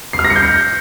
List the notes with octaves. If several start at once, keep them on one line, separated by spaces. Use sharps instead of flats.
C7
F6
A#6
C#7
G6